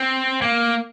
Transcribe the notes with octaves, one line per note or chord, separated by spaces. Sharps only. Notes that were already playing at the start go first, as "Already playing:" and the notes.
Already playing: C4
A#3